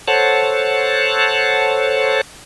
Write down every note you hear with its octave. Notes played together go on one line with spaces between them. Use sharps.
A4 C5 C#5 F#5 A5